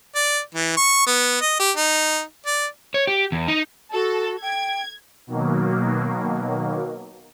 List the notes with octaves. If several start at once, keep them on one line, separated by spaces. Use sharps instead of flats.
D5
E3
C#6
B3
D#5
G4
D#4
D5
C#5
G4
E2
D#4
F#4 A4
G5 G#6
B2 D#3 F#3 A#3